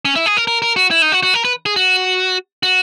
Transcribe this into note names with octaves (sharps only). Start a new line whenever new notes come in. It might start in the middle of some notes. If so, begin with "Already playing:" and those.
C#4
E4
G#4
A#4
A#4
A#4
F#4
E4
D#4
F#4
F#4
A#4
B4
G#4
F#4
F#4